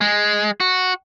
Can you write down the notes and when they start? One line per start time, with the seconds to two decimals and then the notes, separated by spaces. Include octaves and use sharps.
0.01 G#3
0.60 F#4